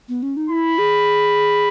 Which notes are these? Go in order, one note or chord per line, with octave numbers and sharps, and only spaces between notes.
B3
C#4
D#4
E4 B5
G#4